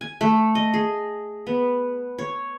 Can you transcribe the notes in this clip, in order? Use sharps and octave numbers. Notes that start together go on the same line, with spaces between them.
G#5
A3
D#5
G#4
B3
C#5